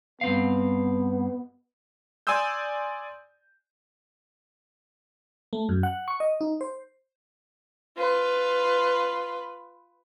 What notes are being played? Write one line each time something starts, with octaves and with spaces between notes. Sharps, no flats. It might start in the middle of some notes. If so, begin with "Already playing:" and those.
G2 B3 C4 F5
D5 G#5 C6 D#6 E6 G6
A3
F#2
F#5
C#6
D#5
D#4
C5
F4 B4